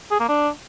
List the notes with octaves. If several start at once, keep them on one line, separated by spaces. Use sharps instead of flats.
G#4
A#3
D4